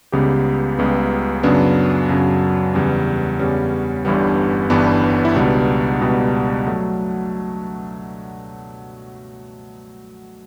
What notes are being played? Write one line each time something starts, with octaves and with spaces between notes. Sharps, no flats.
C#2 C#3 G3 B3 G4 B4
C#2 C#3 G3 B3
F#2 C#3 F#3 B3 D4
F#2 C#3 F#3
E2 C#3 G3 B3
E2 C#3 G3 B3 C#4
G1 G2 E3 G3 B3
G1 G2 E3 G3 B3 D4
E4
C#2 B2 G3 B3 D4
C#2 B2 G3 B3
F#3 A3